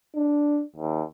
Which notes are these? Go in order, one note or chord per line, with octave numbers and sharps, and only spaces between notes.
D4
D#2